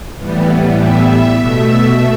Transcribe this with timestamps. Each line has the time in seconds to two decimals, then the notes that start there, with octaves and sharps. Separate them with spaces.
0.17 A2 E3 G3 B3
0.76 E5
1.07 E5
1.36 B2 A3 E5